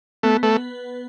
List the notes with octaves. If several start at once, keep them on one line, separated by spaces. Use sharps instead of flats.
A3 B3
A3 B4